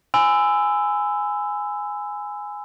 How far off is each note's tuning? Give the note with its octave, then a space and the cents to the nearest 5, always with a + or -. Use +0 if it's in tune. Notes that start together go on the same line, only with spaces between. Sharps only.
G#5 +0 B5 +45 E6 +0